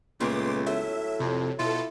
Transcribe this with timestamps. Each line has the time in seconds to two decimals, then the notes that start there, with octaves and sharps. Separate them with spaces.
0.20 C#2 A#2 A3 B3 C6 D6
0.67 A2 F#3 E5
1.20 F2 C3
1.59 B2 E4 F4 A4